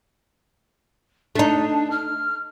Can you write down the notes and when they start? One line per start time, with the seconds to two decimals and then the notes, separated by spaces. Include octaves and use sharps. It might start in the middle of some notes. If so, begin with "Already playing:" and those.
1.35 A3 D4 D#4
1.91 F6